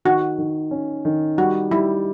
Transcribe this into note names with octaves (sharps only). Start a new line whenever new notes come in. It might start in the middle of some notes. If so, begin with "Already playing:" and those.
D#3 F#4
D#3
C#4
D#3
G3 F#4
G3 E4